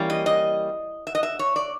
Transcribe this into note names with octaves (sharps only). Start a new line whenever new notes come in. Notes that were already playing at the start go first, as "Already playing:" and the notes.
Already playing: E3 G3 A#3 C#4
D#5
D#5
E5
D#5
E5
C#5
D5